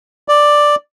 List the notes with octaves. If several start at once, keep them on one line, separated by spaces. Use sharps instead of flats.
D5